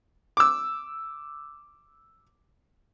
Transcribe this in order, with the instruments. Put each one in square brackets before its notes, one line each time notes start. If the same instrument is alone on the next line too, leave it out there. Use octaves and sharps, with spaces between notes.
[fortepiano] D6 E6